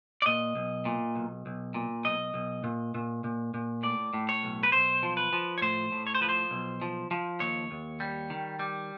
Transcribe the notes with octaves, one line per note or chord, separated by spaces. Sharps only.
D5
A#2 D#5
B1
A#2
B1
B1
A#2
B1 D#5
B1
A#2
A#2
A#2
A#2
A2 D5
A2
C#5
B1
B4
B1 C5
F3
B4
F3
C#5
A2 C5
A2
C#5
C5
F3 B4
C5
B1
F3
F3
D#2 C#5
D#2
G3
D#3
G3